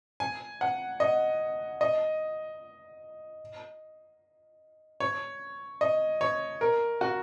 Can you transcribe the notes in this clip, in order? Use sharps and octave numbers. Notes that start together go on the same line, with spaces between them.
G#5
F#5
D#5
D#5
C#5
D#5
C#5
A#4
F#4